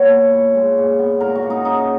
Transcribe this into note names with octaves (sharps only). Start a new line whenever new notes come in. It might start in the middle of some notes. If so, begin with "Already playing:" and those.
Already playing: A#2 B3 B4 C#5
A#3
A#2
G#3
A#2
B3
A#2 A#4
F#4
A#2
D#4
C#3 D#4